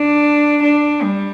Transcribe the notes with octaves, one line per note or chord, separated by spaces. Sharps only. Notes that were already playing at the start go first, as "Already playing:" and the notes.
Already playing: D4
D4
G3